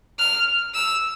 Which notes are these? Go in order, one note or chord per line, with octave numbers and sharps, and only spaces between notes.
F6
E6